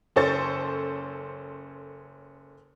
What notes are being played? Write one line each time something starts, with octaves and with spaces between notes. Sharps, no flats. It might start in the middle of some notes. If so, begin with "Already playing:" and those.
F#1 C#4 A4 C5 C#6 A6